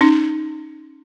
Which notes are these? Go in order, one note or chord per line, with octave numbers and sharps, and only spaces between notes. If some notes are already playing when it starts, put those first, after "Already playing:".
C#4 D#4